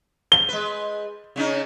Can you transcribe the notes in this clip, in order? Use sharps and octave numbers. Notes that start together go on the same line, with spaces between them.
G7
G#3 B4
C#3 C#4 D#4